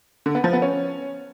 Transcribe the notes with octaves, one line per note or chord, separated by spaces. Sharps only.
D3
B3
F3
B3
C#4